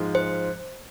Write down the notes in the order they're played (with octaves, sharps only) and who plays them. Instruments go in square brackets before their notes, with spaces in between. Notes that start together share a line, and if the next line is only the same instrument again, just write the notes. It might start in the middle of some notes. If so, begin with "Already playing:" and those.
Already playing: [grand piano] G#2 F3 G#3
[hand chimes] C5